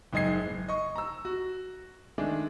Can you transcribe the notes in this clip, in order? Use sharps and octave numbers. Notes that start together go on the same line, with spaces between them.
F#1 G#2 D#5 G#6 C7
F#1
D#5 C#6
A#5 E6
F#4
D#3 G#3 A3 D4